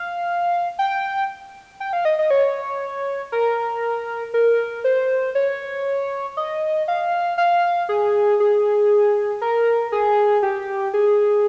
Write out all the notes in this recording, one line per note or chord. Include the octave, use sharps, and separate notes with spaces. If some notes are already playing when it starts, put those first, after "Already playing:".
Already playing: F5
G5
G5
F5
D#5
D#5
C#5
A#4
A#4
C5
C#5
D#5
F5
F5
G#4
G#4
A#4
G#4
G4
G#4